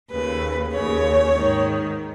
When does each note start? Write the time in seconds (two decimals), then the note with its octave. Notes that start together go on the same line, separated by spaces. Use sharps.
0.10 D#2 C#3 B4
0.72 D#2 C#3 C#5
1.35 G#2 D#3